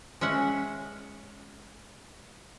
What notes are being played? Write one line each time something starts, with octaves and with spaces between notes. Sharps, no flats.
G#3 C#4 E5 F#5